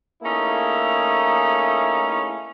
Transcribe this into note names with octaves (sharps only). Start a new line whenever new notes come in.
A3 A#3 C#4 D#4 E4 G#4